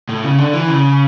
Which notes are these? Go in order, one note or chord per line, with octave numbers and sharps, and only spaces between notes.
A2
C#3
D3
E3
C#3